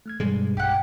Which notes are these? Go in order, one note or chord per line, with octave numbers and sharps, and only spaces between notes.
A3 F6 G#6
G2 B2 G3 G#3
B1 G4 F#5